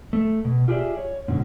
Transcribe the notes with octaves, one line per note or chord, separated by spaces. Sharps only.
A3
B2
F4 G4 G#4 B4 D5 E5
C#5
G#2 B2 D3